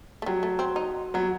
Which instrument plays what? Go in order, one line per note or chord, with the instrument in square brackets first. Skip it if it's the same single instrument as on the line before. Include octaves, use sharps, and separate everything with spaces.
[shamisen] A3
[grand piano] F#3 [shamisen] G3
[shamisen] A3
C4
D#4
[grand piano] F#3 [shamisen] B3